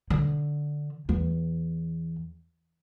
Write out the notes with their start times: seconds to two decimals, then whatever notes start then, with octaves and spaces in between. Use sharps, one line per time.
0.10 D3
1.09 E2